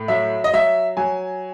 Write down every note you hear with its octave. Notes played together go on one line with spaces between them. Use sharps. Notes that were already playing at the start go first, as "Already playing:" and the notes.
Already playing: A2
F#3 E5
D#5
F#3 E5
F#3 G#5